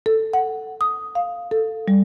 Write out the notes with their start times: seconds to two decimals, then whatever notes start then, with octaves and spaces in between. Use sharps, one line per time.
0.06 A4
0.33 F#5
0.81 D#6
1.15 F5
1.51 A4
1.88 G3